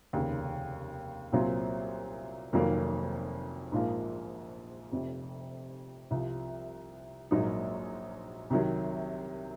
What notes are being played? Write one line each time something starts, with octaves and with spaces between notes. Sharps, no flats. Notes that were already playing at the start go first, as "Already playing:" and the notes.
F1 D#2 C#3
C2 A#2 F#3 C4 F4
F1 F2 D#3 F#3 A#3
A#1 G#2 F3 A#3
F1 F2 C3
C2 C3 F3
A#1 G#2 F#3 A#3 D#4
C2 C3 D#3 F#3